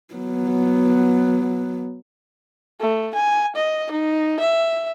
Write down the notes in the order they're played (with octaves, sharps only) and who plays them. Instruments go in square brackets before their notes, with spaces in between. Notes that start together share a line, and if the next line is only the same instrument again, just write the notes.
[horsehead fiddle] F#3 B3
[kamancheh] A3
G#5
D#5
D#4
E5